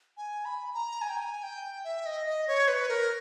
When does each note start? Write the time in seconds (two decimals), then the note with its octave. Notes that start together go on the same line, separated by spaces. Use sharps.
0.17 G#5
0.45 B5
0.74 A#5
1.02 G#5
1.09 G5
1.16 G#5
1.43 G5
1.84 E5
2.06 D#5
2.27 D#5
2.47 C#5
2.68 B4
2.89 A#4